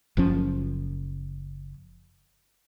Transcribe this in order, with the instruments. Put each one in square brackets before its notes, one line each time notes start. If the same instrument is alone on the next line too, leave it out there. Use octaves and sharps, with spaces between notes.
[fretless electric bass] F#1 F3 C#4